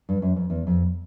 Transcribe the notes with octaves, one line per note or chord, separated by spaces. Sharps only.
G2
F#2
F2
E2
F2